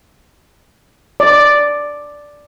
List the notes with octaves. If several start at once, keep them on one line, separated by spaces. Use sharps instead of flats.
D5